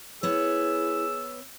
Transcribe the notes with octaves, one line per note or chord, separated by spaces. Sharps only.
B3 E4 G#4 C#5 E6